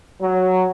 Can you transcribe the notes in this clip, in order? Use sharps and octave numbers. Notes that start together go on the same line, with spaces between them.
F#3